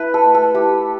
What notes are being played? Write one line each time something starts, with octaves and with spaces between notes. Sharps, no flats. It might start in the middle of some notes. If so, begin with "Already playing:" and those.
Already playing: E4 B4
A4
A3
A4
E4 G4